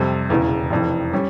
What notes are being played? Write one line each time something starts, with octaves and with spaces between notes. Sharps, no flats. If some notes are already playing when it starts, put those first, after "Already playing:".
Already playing: F2 C3 G3
E1 E2 C#3 E3
F1 F2 E3
G3 C#4